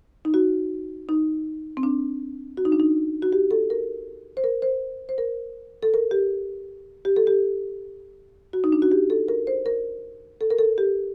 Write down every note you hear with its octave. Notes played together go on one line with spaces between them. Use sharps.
D#4
F#4
D#4
C4
D4
F#4
D#4
D4
D#4
F#4
G4
A4
A#4
C5
A#4
C5
C5
A#4
A4
A#4
G4
G4
A4
G4
F#4
D#4
D4
F#4
G4
A4
A#4
C5
A#4
A4
A#4
A4
G4